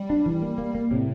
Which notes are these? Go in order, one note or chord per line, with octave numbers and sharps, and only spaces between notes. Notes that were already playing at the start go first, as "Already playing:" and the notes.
Already playing: G3
D4
E3
A#3
A#3
A#3
A2 C3